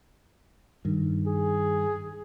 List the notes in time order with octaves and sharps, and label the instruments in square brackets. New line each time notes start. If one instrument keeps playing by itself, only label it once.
[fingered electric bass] G2 D#3
[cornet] G#4